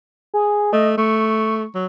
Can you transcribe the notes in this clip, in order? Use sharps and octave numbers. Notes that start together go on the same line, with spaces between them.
G#4
A3 D#5
A3 C#6
F#3